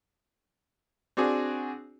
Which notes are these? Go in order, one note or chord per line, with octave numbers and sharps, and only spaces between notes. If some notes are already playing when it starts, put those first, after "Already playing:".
C4 D4 F#4 G#4